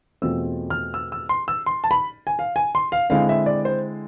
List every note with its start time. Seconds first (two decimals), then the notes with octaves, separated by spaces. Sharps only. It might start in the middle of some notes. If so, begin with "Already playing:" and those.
0.22 E2 B2 A3 C4 F4 E6
0.70 F6
0.94 E6
1.12 E6
1.29 C6
1.48 E6
1.66 C6
1.84 A5
1.91 B5
2.27 G#5
2.39 F5
2.56 G#5
2.75 C6
2.92 F5
3.10 D3 G#3 C4 E4 F5
3.29 E5
3.46 D5
3.65 C5